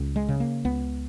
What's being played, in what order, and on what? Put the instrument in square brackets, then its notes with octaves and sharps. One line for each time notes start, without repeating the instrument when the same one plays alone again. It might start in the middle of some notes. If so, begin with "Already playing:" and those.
Already playing: [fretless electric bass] C#2
G#3
C#3
A#3
C#2 B3